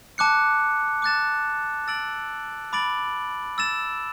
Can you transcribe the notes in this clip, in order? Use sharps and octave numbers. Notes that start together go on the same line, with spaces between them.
A5 D6 F#6 C#7
D6 F#6 A6 E7
E6 A6 D7 F#7
B5 D6 A6 D7 F#7
E6 A6 E7